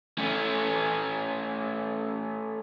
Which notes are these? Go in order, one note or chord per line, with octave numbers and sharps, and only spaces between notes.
A3 C#4